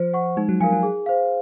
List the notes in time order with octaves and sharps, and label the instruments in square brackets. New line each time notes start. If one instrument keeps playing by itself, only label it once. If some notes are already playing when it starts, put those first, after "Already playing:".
Already playing: [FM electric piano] F3 [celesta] C5
[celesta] F#5 C#6
[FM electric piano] G#3 [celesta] D#4
[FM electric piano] F#3
[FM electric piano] F3 [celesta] A#4 F5 G#5
[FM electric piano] F#3
[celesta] G#4
C5 F5